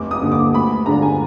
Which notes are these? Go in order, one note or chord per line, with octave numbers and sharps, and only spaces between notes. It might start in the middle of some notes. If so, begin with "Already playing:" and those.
Already playing: F1 D6
D#6
D#2 D3
D6
D2 B5
D3 G#3 D4 F4 A#5
G#5